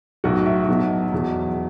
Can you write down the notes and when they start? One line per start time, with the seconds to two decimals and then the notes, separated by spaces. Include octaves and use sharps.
0.24 B1 A2 F#3 F#4
0.46 E5
0.68 B1 B2 F#3
1.13 E2 B2 F#3